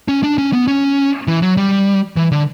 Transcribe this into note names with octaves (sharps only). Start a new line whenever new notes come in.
C#4
D4
C#4
B3
C#4
E3
F#3
G3
E3
D3